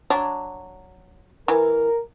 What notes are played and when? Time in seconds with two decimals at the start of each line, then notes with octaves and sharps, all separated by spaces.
0.10 F#3 D4
1.48 E3 A#4